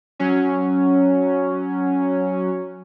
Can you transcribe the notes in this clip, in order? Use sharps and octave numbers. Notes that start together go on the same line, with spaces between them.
F#3 C#4